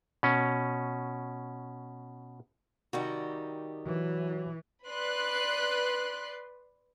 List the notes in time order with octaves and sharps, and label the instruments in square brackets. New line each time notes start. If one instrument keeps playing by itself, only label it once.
[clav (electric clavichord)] B2 C#4
[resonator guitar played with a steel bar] C3 G3 F#4 [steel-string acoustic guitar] D#3 D#4 G4
[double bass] E3 [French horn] F#3
[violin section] B4 D5 C6 F#6